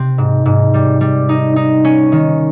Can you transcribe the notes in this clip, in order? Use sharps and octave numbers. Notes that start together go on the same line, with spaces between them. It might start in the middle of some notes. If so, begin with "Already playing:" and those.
Already playing: C3 C4
G#2
G#2
G3
G3
D#4
D#4
C#4
D#3